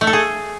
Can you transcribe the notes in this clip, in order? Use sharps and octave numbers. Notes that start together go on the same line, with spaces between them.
A3
A4
G#4